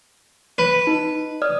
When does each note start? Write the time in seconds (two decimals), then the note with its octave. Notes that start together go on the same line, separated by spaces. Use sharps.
0.58 B4
0.87 D#4
1.42 D5 D#6 F6